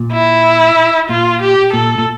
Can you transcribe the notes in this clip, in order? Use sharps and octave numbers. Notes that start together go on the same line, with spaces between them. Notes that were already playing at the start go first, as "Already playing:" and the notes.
Already playing: A#2
E4
A#2 F4
G4
A#2 A4
A#2